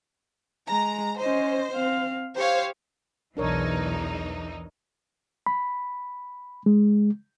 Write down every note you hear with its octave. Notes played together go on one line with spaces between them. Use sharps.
G#3 A#5
C#4 C5 D#5
C4 F5
G4 C5 C#5 F5
B1 E2 E3 D4 D#4 A#4 C#5
B5
G#3